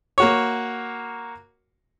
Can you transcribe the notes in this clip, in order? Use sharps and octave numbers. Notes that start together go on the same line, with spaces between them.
A#3 F#4 C#5